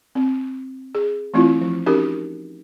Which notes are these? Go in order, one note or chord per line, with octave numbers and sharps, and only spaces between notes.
C4
G#4
E3 A3 C4 E4 F4
F3
C#4 D#4 F#4 G4 A#4